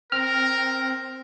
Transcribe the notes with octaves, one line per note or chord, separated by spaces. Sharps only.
C4 A#4 F6